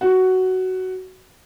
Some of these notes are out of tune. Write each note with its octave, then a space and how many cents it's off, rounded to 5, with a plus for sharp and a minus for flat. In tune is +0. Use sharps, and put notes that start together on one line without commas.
F#4 +10